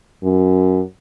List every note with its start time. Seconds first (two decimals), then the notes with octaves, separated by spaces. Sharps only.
0.23 F#2